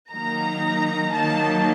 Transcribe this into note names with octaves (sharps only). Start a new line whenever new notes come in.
D#3 F#3 A#3 D#4 A#5
D#3 F#3 A#3 D#4 A5